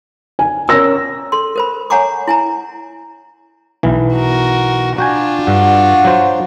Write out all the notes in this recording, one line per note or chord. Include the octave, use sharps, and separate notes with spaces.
G#5
C#4 A#4 E6 A#6
A4 C6
A#4 C5 B5
C#5 F#5 G#5 A#5 C#6 D6
E4 G#5 A#5
B1 E3
F#4 A#4
D4 F4 F#4 G5 G#5
G2 F#4
F#3 C5